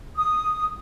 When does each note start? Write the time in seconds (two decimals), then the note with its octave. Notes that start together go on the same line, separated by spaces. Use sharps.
0.17 D#6